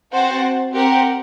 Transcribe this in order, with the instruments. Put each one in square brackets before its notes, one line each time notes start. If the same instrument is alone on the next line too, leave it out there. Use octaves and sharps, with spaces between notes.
[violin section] C4 F#4 C5 F#5 A5
C4 G4 A#4 F#5